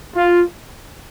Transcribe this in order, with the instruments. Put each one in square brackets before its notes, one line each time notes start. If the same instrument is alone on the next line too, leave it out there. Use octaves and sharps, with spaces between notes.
[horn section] F4